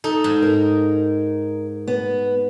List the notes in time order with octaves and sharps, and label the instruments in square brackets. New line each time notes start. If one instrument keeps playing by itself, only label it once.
[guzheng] D#4 [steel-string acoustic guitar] A4
[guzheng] G#2
[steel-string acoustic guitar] A#4
B3